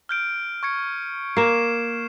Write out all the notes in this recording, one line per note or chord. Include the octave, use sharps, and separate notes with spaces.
F6 G6 D7
C#6 G#6 C#7
A#3 A#4 C7 E7